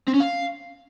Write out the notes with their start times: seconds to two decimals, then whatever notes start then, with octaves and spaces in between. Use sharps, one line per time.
0.08 C4
0.14 C#4
0.20 F5